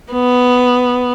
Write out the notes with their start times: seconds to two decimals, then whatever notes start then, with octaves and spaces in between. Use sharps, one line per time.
0.12 B3